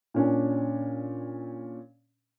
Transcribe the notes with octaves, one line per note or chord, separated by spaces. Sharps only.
A#2 C#4 D4